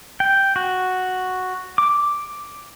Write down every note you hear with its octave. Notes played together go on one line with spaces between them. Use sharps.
G5
F#4
D6